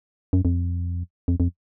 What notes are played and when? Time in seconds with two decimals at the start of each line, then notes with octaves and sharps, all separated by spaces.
0.33 F#2
0.45 F2
1.28 F2
1.40 F2